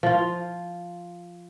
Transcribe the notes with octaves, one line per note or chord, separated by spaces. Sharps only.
F3 F4